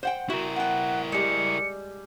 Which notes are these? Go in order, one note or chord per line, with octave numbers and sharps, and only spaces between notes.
C5 F#5 G5
E4 F#4 A#4
B3 F#5 G5
G3 G#3 C#7